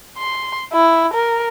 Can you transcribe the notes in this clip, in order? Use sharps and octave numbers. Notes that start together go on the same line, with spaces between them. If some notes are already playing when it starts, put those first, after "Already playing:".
C6
E4
A#4